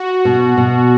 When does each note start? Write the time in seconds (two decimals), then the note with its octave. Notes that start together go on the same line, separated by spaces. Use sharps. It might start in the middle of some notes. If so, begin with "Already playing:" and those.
Already playing: F#4
0.25 B2
0.58 B2